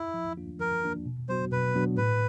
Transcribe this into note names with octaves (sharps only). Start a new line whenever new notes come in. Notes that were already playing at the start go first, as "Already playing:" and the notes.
Already playing: E4
F3
A#3 D4 F4
F3 A#4
A#3 D4 F4
B2
F#3 B3 D4 F#4 C5
B2 B4
F#3 B3 D4 F#4
A2 B4